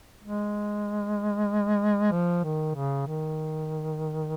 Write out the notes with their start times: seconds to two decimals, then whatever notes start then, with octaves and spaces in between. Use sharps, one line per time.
0.23 G#3
2.12 F3
2.44 D#3
2.75 C#3
3.07 D#3